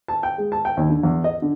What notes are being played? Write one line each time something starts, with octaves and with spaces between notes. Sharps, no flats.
A5
G5
G#3
A5
G5
D#2
D3
E2
D#5
D3